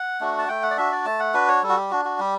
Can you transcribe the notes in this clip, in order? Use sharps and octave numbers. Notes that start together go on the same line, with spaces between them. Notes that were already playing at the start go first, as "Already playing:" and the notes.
Already playing: F#5
A3 D4 F#4
A5
A3 G5
F#5
D5
D4 F#4 E5
D5
A3 A5
F#5
D4 F#4 B4
C#5
G3 A4
F#4
G4
D4 F#4
F#4
G3 G4